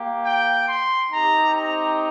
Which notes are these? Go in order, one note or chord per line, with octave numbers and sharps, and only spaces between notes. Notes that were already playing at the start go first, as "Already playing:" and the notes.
Already playing: A#3 G4
G5
C6
C4 D#4 G4 A#5
A#5